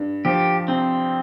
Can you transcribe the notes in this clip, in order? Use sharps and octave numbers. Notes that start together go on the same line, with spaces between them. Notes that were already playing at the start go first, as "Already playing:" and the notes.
Already playing: G2
F3 G4
C3 C4